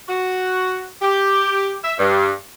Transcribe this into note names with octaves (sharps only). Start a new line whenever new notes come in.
F#4
G4
E5
G2